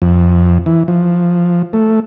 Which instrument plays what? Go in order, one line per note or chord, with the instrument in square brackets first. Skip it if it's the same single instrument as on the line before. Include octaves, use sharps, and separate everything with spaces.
[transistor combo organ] F2
E3
F3
A3